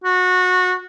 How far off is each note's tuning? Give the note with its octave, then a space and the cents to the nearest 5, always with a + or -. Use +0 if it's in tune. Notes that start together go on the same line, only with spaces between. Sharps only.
F#4 -20